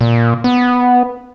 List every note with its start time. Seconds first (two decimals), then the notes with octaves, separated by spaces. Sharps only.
0.01 A#2
0.44 B3